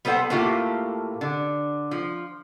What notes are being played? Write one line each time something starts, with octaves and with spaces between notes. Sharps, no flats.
G3 B3 A4 C5 F#5
A2 A3 A#3 F4 G4
D3
F3